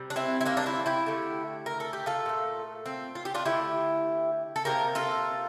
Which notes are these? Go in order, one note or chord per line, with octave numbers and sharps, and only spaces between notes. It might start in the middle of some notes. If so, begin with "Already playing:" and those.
Already playing: C3 G3
D4
C4 E4
E4
A#3 D4
D4
C4 E4
E4 G4
D3 A3
A#4
A4
G4
F4 A4
A#2 A3
C4
F4
G4
D4 F4
D3 A3 E4 G4
A4
C3 F3 A#3 G4 A#4
F4 A4